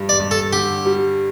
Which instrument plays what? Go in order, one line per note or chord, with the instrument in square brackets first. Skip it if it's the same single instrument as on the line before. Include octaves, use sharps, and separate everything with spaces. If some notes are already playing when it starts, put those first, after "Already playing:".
Already playing: [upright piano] G2
[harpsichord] D5
[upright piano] G2
[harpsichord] A4
[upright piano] D3 [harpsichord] G4
[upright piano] G3